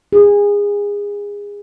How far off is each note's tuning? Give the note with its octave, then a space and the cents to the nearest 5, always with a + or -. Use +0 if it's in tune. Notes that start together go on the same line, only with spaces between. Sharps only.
G#4 -25